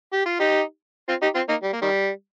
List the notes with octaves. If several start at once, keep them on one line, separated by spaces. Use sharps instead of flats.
G4
F4
D#4 G4
C4 F4
D#4 G4
C4 F4
A#3 D#4
G3
A#3
D#3 G3